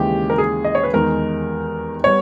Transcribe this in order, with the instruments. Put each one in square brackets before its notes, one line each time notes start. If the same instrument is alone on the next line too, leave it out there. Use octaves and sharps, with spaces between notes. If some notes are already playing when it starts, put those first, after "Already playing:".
Already playing: [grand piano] D#2 C#3 E3 G#3 [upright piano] G4
[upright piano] A#4
G#4
D#5
C#5
B4
[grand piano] E2 D#3 G#3 D#4 [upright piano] A#4
[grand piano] G3 B3 [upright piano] C#5